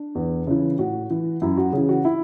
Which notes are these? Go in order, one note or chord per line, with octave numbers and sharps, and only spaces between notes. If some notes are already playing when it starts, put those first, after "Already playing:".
Already playing: D4
E2
C#3 E3
A2 F#4
E3
F#2 E4
F#4
C#3 E3 G#4
F#4
E4